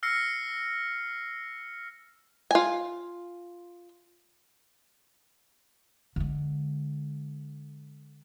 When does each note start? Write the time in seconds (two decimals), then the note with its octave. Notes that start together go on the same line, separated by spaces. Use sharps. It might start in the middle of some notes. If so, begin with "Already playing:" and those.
0.03 E6 F6 A#6 C7 C#7
2.51 F4 G#5
6.16 D3 G#3